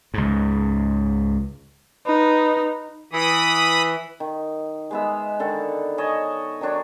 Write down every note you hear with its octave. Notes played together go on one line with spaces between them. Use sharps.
C#2 G#2
D#4 B4
E3 B5 D#6
D#3
G#3 B3 E5
D3 D#3 A4
C#5 D#5 G#5 A5
D#3 F#3 D4 C#5